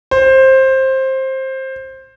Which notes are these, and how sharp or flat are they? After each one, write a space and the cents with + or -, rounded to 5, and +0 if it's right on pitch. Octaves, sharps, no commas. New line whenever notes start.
C5 +15